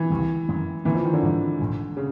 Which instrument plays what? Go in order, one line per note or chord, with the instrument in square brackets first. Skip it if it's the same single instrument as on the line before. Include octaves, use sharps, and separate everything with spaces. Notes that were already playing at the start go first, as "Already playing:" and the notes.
Already playing: [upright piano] E3
[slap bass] C#2 C3 D#3 G3
F#2 D#3 G#3
[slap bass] D2 D3 G3 A#3 [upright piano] E3
[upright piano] F3
D#3
D3
[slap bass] G#2 E3 G3
A#1 G#2 E3
[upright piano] C#3